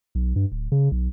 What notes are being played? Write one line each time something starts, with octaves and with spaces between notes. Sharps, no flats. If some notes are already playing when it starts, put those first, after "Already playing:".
B1
G2
D1
C#3
B1